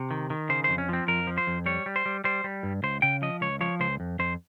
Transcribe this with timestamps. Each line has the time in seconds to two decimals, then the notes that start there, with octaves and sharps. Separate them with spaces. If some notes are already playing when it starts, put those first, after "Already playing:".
Already playing: C3
0.11 D#3
0.30 D#3
0.49 C#3 C5
0.64 F2 C5
0.78 C#4
0.89 F3 C4
1.08 F2 A#4
1.27 F3
1.38 C5
1.47 F2
1.66 G3 C#5
1.86 G3
1.96 C5
2.06 G3
2.24 G3 C5
2.44 G3
2.63 G2
2.83 C#2 C5
3.02 C#3 G5
3.22 F3 D#5
3.41 C#2 C#5
3.61 F3 C#5
3.80 C#2 C5
4.00 F2
4.19 F2 C5